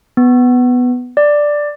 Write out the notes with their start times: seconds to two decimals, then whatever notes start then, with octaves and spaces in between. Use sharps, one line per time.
0.17 B3
1.17 D5